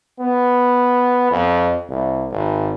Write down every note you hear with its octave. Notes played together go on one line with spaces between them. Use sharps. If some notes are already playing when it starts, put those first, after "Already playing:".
B3
F2
C2
G#1